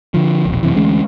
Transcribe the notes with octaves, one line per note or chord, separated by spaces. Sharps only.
D3 F3
E1 A#1
F#2 C3 E3
D2 E3 G#3 C#4